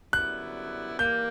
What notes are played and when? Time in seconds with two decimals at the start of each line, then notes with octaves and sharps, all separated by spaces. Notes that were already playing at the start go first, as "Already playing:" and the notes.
0.13 F#2 D3 G3 B3 E4 F#6
0.99 E3 G3 A#3 G6